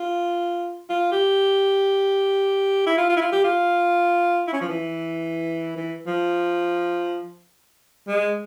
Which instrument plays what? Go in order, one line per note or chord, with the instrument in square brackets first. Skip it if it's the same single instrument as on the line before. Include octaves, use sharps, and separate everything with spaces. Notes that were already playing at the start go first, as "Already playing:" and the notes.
Already playing: [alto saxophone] F4
F4
G4
E4
F4
F4
E4
F4
G4
F4
E4
C#4
F3
E3
E3
F3
G#3